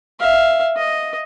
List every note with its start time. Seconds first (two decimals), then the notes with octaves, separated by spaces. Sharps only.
0.20 E5 F5
0.77 D#5